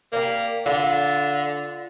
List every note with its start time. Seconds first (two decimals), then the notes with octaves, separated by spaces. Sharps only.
0.13 A#3 G4 D5
0.66 D3 F4